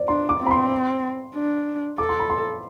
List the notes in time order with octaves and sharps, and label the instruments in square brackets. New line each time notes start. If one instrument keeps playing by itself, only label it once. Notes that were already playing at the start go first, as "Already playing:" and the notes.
Already playing: [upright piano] C5 D5
[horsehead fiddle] D4 [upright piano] C6
[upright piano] D6
[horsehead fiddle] C4
[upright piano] B5
C6
[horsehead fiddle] D4
[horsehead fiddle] A4 [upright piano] D6
[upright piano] C6
B5
C6